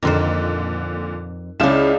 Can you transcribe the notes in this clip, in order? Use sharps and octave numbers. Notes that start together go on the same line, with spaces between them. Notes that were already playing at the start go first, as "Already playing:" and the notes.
F2 A#2 D3 D#3 F4 C5
C#2 C#3 G#3 C#4 D4 E4 F5 E7